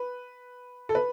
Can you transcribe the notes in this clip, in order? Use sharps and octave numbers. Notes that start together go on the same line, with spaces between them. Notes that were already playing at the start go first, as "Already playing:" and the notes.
Already playing: B4
A4
B4